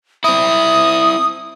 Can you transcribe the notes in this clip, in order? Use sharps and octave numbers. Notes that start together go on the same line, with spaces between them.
C4 E4 D#6